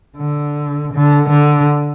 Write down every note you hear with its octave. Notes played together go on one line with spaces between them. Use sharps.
D3
D3
D3